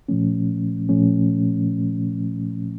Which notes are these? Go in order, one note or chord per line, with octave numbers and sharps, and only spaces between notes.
A#2 F3 A3 C#4
A#2 F3 A3 C#4